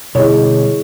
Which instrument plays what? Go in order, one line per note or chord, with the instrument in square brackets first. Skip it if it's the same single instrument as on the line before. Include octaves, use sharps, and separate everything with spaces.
[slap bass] B2 D3 G3 [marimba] E4 G#4 D#5 [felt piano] C#5